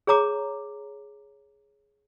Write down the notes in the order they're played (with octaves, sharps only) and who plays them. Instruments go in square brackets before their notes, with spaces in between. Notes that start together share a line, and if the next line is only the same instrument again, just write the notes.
[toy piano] G#4 C#5 A#5 D6